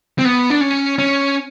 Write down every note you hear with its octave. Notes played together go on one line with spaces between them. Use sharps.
C4
B3
D4
C#4
C#4